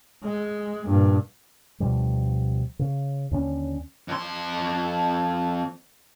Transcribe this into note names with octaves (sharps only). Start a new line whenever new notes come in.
G#3
G2 A#2
D2 B2 F3 G3
C#3
D#2 D3 C#4
F2 C6